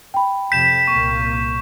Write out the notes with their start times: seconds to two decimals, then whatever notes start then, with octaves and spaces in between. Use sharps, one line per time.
0.14 G5 B5
0.52 F2 C3 G6 B6 E7
0.87 C2 A#2 A#3 C#6